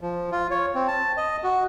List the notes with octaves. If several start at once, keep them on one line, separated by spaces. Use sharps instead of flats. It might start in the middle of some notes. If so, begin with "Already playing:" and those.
F3
F4
C#5
C4
A5
D#5
F#4